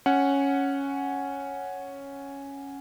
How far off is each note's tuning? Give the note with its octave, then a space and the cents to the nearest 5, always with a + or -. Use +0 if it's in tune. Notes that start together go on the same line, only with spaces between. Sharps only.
C#4 +0 F#5 +0